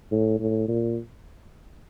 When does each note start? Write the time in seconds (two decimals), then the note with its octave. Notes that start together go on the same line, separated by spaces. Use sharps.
0.11 A2
0.40 A2
0.68 A#2